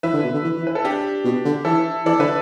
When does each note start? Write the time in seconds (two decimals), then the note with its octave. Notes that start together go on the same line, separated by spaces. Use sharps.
0.03 E3 B4 E5
0.14 D3
0.23 B2
0.33 D3
0.44 E3
0.57 E3
0.67 B4
0.75 A4
0.84 D4 G4
1.24 B2
1.45 D3
1.65 E3 E4 A4
2.06 E3 A4 D5
2.19 D3 B4 E5